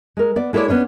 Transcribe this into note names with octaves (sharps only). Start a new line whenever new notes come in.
G#3 A#4
B3 D5
G#3 E4 A4 B4 C#5 D5
B3 C#4 D4 C#5